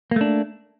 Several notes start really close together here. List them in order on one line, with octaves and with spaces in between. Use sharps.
A#3 A3 D4